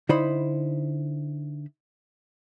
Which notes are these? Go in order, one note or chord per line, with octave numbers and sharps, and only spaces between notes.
D3 D#4 E4 C5 B5